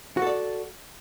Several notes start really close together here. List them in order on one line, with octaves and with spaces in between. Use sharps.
F#4 A4 D5